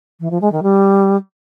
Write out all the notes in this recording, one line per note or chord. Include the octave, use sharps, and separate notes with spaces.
E3
F3
G#3
D#3
G3